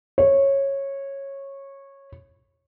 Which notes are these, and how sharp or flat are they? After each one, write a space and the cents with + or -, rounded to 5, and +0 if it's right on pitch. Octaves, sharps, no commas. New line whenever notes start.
C#5 -15